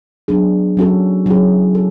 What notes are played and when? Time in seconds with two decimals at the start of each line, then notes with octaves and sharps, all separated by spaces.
0.28 F#3 B3 D4 G#4
0.77 F#3 C#4 F#4 A4
1.26 F#3 C#4 E4 G#4
1.75 A4